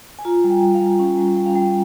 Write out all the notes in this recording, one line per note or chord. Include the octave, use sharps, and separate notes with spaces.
G#5
F4 A#5
G3
G5
G3
F5
G3
C#4
G3
G3 G5
F5
G3 G5